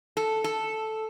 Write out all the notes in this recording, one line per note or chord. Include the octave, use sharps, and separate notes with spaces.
A4
A4